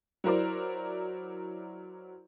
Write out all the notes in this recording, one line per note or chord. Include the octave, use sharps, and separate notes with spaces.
F#3 E4 A#4 C5 D5